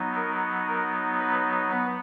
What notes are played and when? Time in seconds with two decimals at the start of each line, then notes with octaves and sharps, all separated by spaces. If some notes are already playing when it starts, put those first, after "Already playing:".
Already playing: F#3 B3 D#4
0.15 A#4
0.68 A#4
1.19 B4
1.71 B3 B4